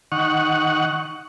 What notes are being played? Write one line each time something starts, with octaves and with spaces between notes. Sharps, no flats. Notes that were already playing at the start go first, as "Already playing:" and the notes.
D#3 F#5 C#6